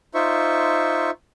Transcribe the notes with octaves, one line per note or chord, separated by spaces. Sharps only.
D#4 F4 C5 E5 C#6